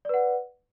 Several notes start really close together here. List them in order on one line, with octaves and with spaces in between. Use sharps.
D5 B4 F#5